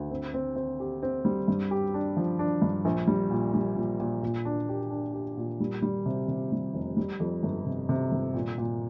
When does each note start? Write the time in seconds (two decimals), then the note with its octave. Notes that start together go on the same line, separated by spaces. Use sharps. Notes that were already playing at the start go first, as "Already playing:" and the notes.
Already playing: D2
0.11 C4
0.34 C4
0.56 C4
0.80 G4
1.03 C4
1.25 G3
1.48 G2
1.71 G4
1.94 D4
2.17 F3
2.39 D4
2.62 G2
2.85 A#1
3.07 G3
3.31 A#2
3.54 G3
3.76 A#2
4.00 A#2
4.23 A#2
4.45 D4
4.69 G4
4.91 D4
5.14 G4
5.37 A#2
5.60 G3
5.82 G3
6.06 C3
6.28 C3
6.52 G3
6.74 F1
6.97 G3
7.20 F2
7.43 G1
7.66 C3
7.89 C3
8.12 G1
8.34 A#2
8.58 A#2